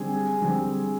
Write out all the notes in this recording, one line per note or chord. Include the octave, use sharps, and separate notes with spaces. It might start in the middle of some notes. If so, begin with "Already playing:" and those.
Already playing: D3 G3 C4 G#4 G#5
D3 G3 C4